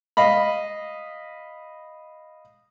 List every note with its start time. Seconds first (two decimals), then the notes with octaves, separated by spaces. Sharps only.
0.17 D#5 F5 B5